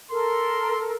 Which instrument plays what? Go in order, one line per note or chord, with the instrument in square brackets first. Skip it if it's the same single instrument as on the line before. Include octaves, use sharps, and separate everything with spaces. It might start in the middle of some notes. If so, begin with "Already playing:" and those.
[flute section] A4 A#4 [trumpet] C6